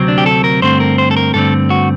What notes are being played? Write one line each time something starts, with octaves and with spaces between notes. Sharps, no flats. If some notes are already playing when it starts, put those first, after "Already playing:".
Already playing: D2 C3 F#3 C4
D4
G4
A4
A#4
G2 D3 A3 C4 C5
A#4
C5
A4
A#4
G2 D3 A3 C4 A4
F#4